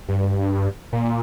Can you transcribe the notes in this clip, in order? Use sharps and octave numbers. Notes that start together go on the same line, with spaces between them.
G2
A#2